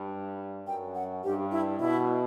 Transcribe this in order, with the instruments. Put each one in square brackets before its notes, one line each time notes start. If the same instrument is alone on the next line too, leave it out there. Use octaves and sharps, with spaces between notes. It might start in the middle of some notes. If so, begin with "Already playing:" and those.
Already playing: [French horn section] G2
[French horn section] F#2 [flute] G5
[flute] F#5
[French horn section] G2 [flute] G4
[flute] E4
[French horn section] B2 [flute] E4